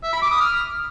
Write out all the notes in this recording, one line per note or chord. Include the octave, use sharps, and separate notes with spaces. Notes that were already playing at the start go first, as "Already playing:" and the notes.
E5
B5
D6
D#6
F6